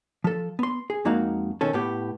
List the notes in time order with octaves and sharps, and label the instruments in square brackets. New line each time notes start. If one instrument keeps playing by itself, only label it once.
[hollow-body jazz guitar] F3 A4
B3 C6
G#4
F2 G#3 A#3 D#4 F#4 F5
B2 D#3 C#4 A4
A2 B3 G4